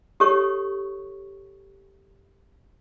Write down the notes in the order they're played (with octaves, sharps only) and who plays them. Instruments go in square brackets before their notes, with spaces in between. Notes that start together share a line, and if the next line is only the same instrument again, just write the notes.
[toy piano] G4 A4 C#5 C#6